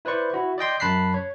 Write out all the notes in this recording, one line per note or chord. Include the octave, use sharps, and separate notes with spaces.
E4 B4 C5 D5 C#6
E4 F#4
D5 D#5 G5 C6
F#2 A5 B5 F#6 B6 C7
C#5